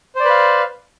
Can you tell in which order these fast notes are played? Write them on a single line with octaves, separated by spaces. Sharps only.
C5 D5 B4 F5